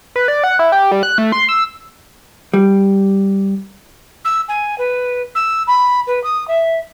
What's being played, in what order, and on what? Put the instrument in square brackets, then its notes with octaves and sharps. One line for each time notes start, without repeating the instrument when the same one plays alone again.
[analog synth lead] B4
D5
F#5
E4
G4
G3
F#6
A3
C6
E6
[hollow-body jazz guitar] G3
[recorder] E6
G#5
B4
E6
B5
B4
D#6
E5